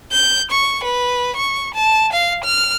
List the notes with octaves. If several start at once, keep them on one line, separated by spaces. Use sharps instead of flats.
G6
C#6
B4
C#6
A5
F5
F6